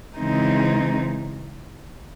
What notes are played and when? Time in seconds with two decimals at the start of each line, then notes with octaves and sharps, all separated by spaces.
0.17 C#3 E3 G#3 C4 D#4